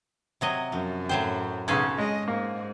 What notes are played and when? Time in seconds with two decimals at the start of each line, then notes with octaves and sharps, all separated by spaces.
0.41 C3 F#3 D#5
0.72 F#2 F3
1.09 A2 F#3 C5 G5
1.68 B1 C#3 C#4 G#4 A4
1.99 G#3 D#5
2.28 G#2 A#3